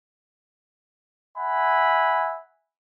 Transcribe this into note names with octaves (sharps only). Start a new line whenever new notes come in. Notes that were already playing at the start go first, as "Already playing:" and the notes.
E5 F#5 G#5 B5